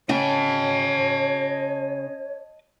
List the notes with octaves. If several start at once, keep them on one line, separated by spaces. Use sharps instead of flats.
C#3 C#5 D#5 G5 A5